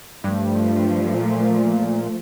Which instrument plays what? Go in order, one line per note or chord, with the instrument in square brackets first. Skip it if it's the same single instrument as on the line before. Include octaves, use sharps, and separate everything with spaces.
[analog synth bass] G2 [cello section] F3 A3
[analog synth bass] A#2